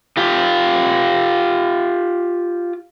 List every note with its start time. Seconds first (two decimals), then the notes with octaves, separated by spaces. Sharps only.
0.17 F4 G4